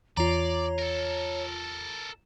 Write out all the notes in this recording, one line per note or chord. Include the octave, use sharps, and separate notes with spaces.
E2 F4 C#5 D5 A#5
A4 A#4